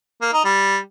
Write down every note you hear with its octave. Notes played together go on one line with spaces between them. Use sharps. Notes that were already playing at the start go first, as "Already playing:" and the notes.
A#3
D#4
G3